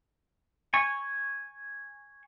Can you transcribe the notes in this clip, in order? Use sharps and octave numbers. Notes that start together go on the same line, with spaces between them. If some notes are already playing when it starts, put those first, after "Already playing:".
G#5 C#6